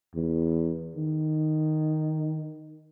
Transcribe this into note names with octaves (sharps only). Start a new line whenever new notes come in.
E2
D#3